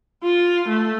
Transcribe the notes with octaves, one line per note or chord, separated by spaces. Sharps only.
F4
A3